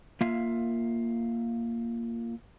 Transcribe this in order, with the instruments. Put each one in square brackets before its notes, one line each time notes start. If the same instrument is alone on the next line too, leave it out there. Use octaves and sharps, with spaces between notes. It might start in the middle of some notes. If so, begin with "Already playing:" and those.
[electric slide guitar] A#3 F4 E5 F5